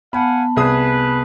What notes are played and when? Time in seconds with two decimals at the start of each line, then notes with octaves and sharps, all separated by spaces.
0.13 B3 F5 F#5 G#5 A5 B5
0.57 C2 G#4 B4 D#6